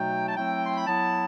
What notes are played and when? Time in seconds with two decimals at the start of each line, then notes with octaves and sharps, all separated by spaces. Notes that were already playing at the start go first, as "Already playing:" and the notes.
Already playing: B2 F#3 A3 D#4 G5
0.28 A5
0.37 F#3 A3 C4 E4 G5
0.66 C6
0.76 B5
0.86 F#3 B3 E4 A5